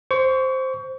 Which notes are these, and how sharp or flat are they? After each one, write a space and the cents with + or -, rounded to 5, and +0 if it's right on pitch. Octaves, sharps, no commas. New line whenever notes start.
C5 +0 C#6 +30